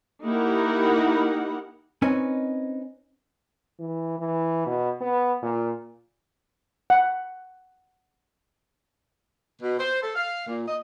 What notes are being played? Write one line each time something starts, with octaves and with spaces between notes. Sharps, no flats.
A#3 D#4 E4 G4 A#4 F#5
C4 C#4 D#4 B4 D#5 G#5
E3
E3
B2
B3
A#2
F#5
B2
C5
A4
F5
A#2
D#5